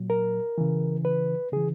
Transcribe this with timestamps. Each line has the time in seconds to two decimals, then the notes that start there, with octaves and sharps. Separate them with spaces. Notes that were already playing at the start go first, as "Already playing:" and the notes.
Already playing: A#2 F#3
0.10 A#4
0.58 C#3 E3
1.05 B4
1.52 C#3 E3 G#4